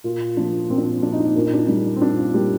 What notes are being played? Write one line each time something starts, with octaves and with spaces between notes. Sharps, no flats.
A#2 F4
F3 A#3 D4
A#2 C4
D4
C4
F3 A#3 D4
D#4
D4
A#2 D4
D#4
D4
G3 A#3 D4
C4
A#2 D4
F4
G3 A#3 G4